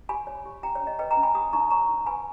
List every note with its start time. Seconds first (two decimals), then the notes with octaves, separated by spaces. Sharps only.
0.09 G4 G#5 B5
0.27 C#5
0.45 G4
0.63 G4 G5 A#5
0.75 C#5
0.81 C#4
0.87 D#5
0.99 B4 D#5 G5
1.11 G5 A#5
1.17 C#4
1.23 G#5 B5
1.35 G4 B5 D#6
1.53 D#4 A#5 C#6
1.71 C#5 A#5 C#6
1.89 D#4
2.06 B4 G#5 B5